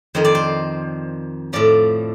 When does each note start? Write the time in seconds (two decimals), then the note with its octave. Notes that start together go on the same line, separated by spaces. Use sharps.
0.15 F2 D#3 C5
0.25 D5
0.35 C5
1.53 A2 F3 D5